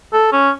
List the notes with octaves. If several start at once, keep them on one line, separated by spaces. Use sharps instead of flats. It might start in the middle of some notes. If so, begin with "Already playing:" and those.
A4
C#4